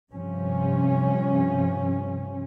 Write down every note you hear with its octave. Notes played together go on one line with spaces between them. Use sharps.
G2 C3 F3 C#4